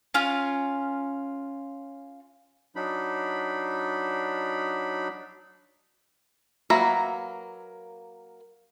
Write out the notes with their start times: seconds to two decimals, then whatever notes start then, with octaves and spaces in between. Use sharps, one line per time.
0.14 C#4 F4
2.76 F#3 D4 D#4 B5
6.70 F#3 A#3 B4 E5 A#5